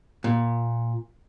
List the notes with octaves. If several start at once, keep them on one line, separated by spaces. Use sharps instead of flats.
A#2